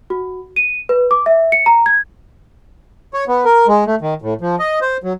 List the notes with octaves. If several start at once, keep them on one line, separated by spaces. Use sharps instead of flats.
F#4
D#7
B4
D6
E5
C#7
A#5
G#6
C#5
B3
A#4
G#3
A3
D#3
A2
F3
D#5
C5
F#3